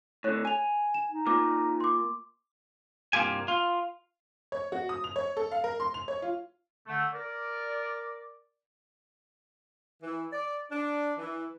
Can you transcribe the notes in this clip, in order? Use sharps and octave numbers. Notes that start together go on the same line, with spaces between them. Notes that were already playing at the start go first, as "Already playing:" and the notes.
A2 D3 C#5 F#6
G#5 D#7 F7
E7
D#4
A#3 F4 D6
C6 D6
C2 G2 A#3 F4 G4 G#5
F4
C#5
F#4
D#6
F7
C#5
A4
F5
A#4
C6
F7
C#5
F4
D3 A3
A#4 D5
E3
D5
D4
E3